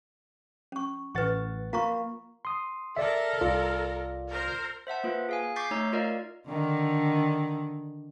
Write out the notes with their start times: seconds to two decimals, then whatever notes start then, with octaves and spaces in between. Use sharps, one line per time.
0.72 C#4 C#6
1.15 A1 B4 F#5 C#6 A6
1.73 A#3 F4 A#5 C#6
2.45 C6 D#6
2.97 A4 A#4 D5 E5
3.41 C2 F4 D5
4.29 A#4 C5
4.87 C5 E5 F#5 A5
5.04 A#3 F4 B4
5.29 G#4 F5 G#5
5.56 C#6 D6 G6 A6 B6 C7
5.71 A3 D#4 C#5 A#5 E6
5.93 F4 A#4 D5 D#5 F5
6.48 D3 D#3